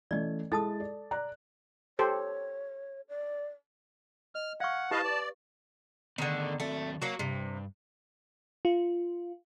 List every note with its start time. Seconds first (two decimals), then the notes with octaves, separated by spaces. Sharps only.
0.11 E3 A3 C#4 D5 D#5
0.52 G#3 E4 A4 A5 D#6 A6
0.80 D5
1.11 D5 A#5 F#6
1.99 G4 A4 C5 C#5
3.09 D5
4.35 D#5 F6
4.60 F5 F#5 C#6 F6 G#6
4.91 E4 G4 B4 D#5 F5 A5
5.04 B4 D5
6.18 D3 D#3 B3 G#4 A4
6.60 D#3 F#3 A3 C4
7.02 F#3 A#3 F#4
7.19 G2 C3
8.65 F4